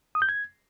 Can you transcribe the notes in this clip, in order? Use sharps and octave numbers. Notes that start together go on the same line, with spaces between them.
D#6
G6
G#6